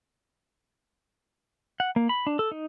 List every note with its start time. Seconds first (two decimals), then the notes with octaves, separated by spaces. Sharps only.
1.80 F#5
1.96 A#3
2.09 B5
2.27 D4
2.39 A4
2.52 D#4